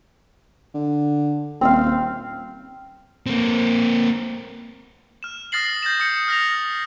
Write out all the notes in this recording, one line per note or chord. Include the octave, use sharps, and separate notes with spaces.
D3
D#1 C4 F5
A#3 C4
F6 E7
D#6 F6 A6 A#6 C7 F#7
F#7
G6 A6 A#6 E7
D#6 C#7
F6 A#6 F7